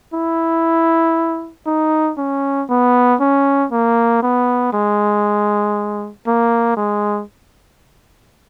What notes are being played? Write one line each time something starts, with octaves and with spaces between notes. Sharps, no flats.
E4
D#4
C#4
B3
C#4
A#3
B3
G#3
A#3
G#3